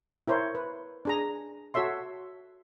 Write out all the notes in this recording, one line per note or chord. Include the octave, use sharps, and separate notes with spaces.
E4 A#4 C5 C#5
B4
D4 G#4 A#5
F#4 A4 C#5 E5 C6